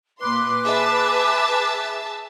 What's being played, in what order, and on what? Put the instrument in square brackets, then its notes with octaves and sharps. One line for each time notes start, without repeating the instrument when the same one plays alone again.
[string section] A#2 C6 [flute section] B4 D6 F#6
[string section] G#4 E5 A5